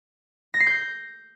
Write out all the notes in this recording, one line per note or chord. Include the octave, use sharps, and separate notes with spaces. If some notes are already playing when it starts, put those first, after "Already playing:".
A#6
C7
G6